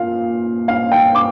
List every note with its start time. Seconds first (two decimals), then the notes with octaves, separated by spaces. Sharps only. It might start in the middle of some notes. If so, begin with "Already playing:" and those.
Already playing: A#2 F5
0.68 F5
0.92 G5
1.15 D6